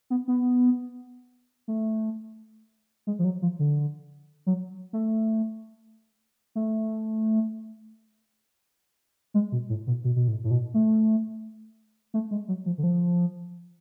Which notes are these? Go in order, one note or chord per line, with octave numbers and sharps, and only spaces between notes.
B3
B3
A3
G#3
F3
F#3
F3
D3
F#3
A3
A3
G#3
B2
A2
B2
B2
B2
A2
A2
B2
A3
A3
G#3
F#3
F3
D3
F3